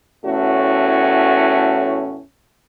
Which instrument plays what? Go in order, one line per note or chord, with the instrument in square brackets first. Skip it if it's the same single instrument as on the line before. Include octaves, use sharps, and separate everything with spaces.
[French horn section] E2 A2 A3 C#4 F#4